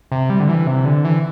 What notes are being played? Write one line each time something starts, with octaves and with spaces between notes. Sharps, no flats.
C3
G3
D3
E3
C3
D3
E3